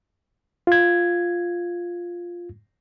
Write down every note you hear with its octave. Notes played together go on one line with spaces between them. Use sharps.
F4 G#6